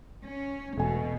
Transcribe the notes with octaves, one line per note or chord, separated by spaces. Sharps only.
C#4
E1 B2 A3 G#5